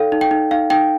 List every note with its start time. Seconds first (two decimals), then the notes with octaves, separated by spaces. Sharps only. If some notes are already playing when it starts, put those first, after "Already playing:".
Already playing: D#4 A4 D5 F5 G5
0.12 D#4
0.21 G5
0.31 D#4
0.51 D#4 F5
0.70 D#4 G5